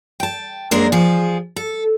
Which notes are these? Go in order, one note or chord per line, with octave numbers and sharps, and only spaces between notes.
G5 A5
F#2 G#3 A#3 D4 A#4 C5
F3 G#4
A4